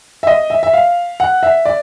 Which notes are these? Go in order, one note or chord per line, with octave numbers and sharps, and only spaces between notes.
E5
D#5
E5
E5
F5
F#5
E5
D5